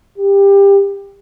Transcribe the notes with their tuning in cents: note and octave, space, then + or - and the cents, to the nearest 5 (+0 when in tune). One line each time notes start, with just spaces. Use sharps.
G4 +20